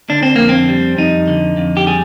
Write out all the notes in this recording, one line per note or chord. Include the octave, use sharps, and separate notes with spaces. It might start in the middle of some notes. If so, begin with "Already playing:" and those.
D3 D4
C4
F2 A#3
C4
G3
F2 D#4
D3
F2
G4
G3 G#4